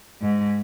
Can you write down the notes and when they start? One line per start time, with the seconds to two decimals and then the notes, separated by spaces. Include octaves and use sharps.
0.21 G#2